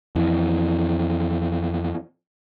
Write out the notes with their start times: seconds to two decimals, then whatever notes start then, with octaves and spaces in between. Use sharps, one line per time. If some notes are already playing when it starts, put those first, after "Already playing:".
0.16 F2 E3